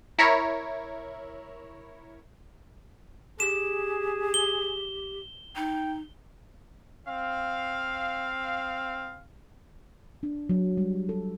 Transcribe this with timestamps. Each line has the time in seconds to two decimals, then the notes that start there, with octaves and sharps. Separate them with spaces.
0.19 E4 A#4 C#5
3.40 G4 G#4 E7
4.34 G7
5.56 D#4 G5
7.08 C4 F5
10.23 D4
10.49 F#3
10.77 G3
11.09 A4